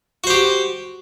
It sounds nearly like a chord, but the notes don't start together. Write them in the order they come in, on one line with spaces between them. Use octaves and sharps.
F#4 C5 G4